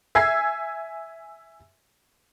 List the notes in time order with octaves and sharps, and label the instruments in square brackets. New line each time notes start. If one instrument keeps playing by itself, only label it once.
[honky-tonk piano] E5 G#5 E6 G#6 C7